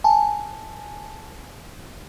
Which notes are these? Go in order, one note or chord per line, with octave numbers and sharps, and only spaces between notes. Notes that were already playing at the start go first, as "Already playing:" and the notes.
G#5 A5